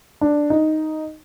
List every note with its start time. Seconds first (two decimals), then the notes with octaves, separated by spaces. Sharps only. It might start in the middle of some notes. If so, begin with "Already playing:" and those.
0.21 D4
0.50 D#4